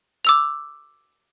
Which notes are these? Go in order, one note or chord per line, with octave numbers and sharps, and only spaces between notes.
D6 E6 F7